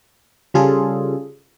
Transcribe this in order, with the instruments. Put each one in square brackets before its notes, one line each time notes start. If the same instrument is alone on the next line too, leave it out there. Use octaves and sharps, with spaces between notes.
[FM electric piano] C#3 G3 F4 G#4 A4